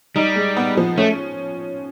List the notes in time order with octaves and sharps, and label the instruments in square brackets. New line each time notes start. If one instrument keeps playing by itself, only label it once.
[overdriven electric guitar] G3 [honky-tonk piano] D#4
[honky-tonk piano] G#3
B3
F3
[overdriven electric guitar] A3 [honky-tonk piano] C#4